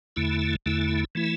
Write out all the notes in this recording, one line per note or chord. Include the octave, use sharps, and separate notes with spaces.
E2 D3 A3 E4
E2 D3 A3 E4
E3 A3 E4